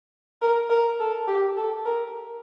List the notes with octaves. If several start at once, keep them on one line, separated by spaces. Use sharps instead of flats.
A#4
A#4
A4
G4
A4
A#4